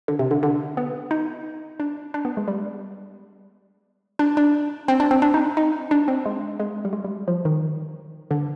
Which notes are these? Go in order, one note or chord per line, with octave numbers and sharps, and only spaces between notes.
D3
C3
D3
D3
B3
D#4
D4
D4
B3
G#3
G3
D4
D4
C4
D4
C4
D4
D#4
D#4
D4
C4
G#3
G#3
G3
G#3
G3
F3
D#3
D3